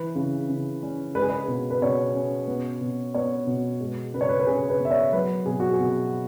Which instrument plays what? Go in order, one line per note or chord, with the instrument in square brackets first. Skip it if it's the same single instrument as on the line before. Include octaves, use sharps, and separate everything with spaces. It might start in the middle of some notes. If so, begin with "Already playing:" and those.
Already playing: [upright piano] E3 B4
C#3
C#3
C#4
G#3 B4
G#4
B4
B2
B4
B2 C#5
C#4
B3
B2
B3 C#5
B2
G#3
C#3 B4
C#5
B4
B4
C#3 G#4
B4
B3
E5
C#5
F#3 B4
B2 G#4
F#4
G#4
B2